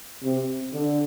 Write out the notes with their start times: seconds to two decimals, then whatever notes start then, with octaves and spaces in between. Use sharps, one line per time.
0.22 C3
0.73 D3